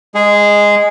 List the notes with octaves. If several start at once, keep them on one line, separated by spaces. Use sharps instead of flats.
G#3 G#4